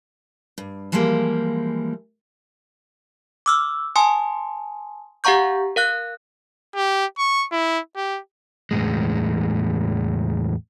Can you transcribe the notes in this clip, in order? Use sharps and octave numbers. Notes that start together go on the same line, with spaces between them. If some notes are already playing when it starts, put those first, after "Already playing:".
G2
E3 F3 G3 G#3 A#3
D6 E6 F6
G#5 A5 C6 D#6
G4 F5 F#5 A#5 C#6 G6
A#4 F5 F#6
G4
C#6
E4
G4
E2 A2 G#3